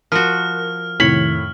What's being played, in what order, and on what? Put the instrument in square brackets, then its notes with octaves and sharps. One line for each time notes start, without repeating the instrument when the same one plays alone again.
[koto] F3 F#4 [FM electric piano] A#4 [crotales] F6
[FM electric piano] F2 C3 D#3 [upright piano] A2 B6 F#7 [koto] C#5